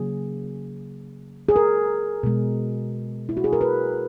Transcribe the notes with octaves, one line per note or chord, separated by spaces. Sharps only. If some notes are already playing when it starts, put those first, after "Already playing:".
Already playing: C#3 F#3 A#3 G#4
G#4
A#4
B2 G#3
E4
F#4
G#4
A#4
B4